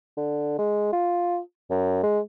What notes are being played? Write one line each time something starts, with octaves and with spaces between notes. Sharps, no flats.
D3
G#3
F4
F#2
G#3